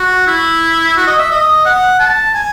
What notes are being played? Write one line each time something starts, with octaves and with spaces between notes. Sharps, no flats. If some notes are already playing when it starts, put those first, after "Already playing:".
Already playing: F#4
E4
F#4
D#5
E5
D#5
F#5
A5
G#5